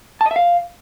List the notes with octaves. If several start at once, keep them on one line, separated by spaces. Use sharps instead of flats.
A5
D#5
E5
F5